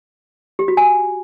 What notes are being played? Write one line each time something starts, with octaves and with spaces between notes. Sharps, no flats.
G4
F#4
G#5